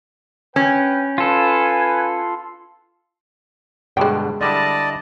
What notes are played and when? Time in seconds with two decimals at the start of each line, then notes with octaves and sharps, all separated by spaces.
0.56 C#4 B4 G5
1.18 F4 A4 B4 G#5
3.97 G2 B2 D3 G#3 G5
4.41 D3 G3 E4 D5 D#5 A5